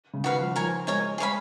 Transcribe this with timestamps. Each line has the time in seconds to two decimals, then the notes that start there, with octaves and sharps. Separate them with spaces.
0.13 C#3
0.24 D#3 F#4 B4 F5
0.40 F3
0.56 F3 A#4 C#5 G#5
0.87 G#3 A#4 C#5 G#5
1.18 G#3 G#4 C#5 F5 B5